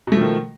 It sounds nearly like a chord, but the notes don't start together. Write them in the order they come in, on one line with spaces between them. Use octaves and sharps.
B2 A3 F3 D#3